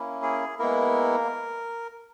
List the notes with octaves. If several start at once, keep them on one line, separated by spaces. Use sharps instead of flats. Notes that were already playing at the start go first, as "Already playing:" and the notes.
Already playing: A#3 C#4 E4
G#4
G#3 A#3 B3 E4 A#4